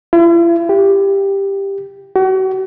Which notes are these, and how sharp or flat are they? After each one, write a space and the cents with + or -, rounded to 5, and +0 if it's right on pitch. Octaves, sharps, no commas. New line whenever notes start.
E4 +45
G4 +5
F#4 +40